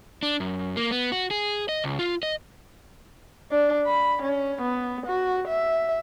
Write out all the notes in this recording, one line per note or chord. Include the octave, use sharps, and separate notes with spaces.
D4
F#2
A#3
B3
F#4
G#4
D#5
C#2
F4
D#5
D4
B5
C#4
B3
F#4
E5